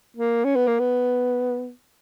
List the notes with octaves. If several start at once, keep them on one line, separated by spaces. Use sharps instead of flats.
A#3
C#4
B3
A#3
B3